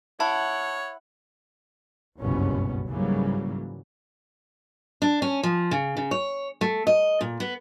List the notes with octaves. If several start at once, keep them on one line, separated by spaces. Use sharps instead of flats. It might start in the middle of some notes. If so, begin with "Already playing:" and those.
E4 C#5 F#5 A5
F#1 C2 G2 B2 B3 C#4
G#2 C#3 E3 F#3 G3 A#3
D4
C#4
F3
C#3
C#3
C#5
A3
D#5
A#2
B3